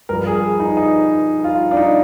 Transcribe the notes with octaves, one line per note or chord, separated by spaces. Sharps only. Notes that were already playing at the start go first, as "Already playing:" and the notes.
G2 F3 A#4
G#4
D#4
D#4
F4
D4
D#4